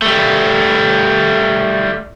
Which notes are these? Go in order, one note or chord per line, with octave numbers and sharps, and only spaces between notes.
G3 A3